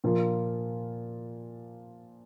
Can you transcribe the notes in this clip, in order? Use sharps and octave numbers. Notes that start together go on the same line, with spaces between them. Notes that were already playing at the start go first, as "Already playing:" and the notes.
A#2 F3 A#3 F4 A#4